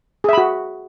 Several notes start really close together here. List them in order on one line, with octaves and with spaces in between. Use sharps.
G#4 E5 B5 F#4